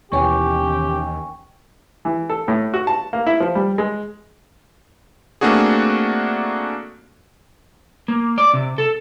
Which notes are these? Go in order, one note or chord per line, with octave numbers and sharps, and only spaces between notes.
D#2 B2 E3 C#4 G4 G5 G#5 C#6
E3
A4
A2
F#4
A5
A#3
E4
F3
G3
G#3
A3 A#3 C4 D4 F#4 G#4
A#3
D5
C3
A4